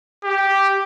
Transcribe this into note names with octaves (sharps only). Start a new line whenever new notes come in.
G4